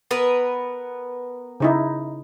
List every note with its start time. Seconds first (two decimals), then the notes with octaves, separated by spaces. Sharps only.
0.11 B3 A#4 B4
1.60 C#3 D#4 E4